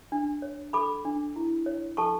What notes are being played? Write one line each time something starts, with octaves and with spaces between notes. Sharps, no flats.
D4
C#5
A4 B5 D6
D4
E4
C#5
A4 A5 C#6